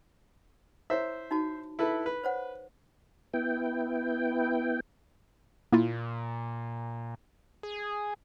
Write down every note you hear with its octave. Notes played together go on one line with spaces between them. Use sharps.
E4 C5 C#5 E5
D#4 F#4 A5
E4 A4 B4
B4
C5 C#5 F#5
B3 E4 G5
A#2 A#3 E4 F4
G#4